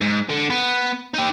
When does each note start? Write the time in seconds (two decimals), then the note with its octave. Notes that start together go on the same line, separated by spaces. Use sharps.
0.01 G#2
0.30 D3
0.50 B3
1.14 D#4 G4